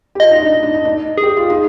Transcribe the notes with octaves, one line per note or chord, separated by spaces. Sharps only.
G4
F4 D#5
D#4
D4
D#4
D4
D#4
D4
G#4
G4
F4
D#4